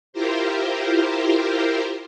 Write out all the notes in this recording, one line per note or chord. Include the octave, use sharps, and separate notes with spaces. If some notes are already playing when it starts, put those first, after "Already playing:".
E4 F4 G4 A#4 C5